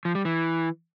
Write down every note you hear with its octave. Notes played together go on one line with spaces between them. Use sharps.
F3
G3
E3